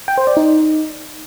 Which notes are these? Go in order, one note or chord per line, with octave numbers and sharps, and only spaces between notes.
G5
C5
D5
D#4